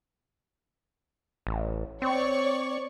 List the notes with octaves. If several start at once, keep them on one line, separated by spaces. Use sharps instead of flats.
A1
C4 C#5 D5 C#6